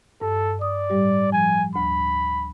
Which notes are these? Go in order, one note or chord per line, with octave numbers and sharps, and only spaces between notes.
G2 A4
D5 D#6
A2 G3 G4
F3 G#5
D2 B5